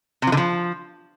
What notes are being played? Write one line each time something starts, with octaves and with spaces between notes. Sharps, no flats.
C3
F3
D3
F3